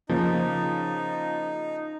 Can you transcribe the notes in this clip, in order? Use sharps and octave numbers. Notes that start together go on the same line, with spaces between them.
C#3 F3 A#3 D#4